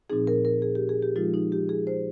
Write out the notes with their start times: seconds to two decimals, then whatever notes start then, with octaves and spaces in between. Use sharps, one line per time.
0.10 A#2 F3 C4 D#4 G#4
0.27 A#4
0.45 A#4
0.62 G#4
0.75 G4
0.89 G#4
1.02 G4
1.16 F3 G#3 D#4 F4
1.34 D#4
1.52 G4
1.69 G#4
1.87 C5